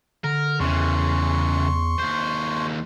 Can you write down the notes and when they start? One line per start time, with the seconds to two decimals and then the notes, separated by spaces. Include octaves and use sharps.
0.24 D3 A#4
0.60 E2 C#3 E3 C6 C#6
2.00 D#2 C5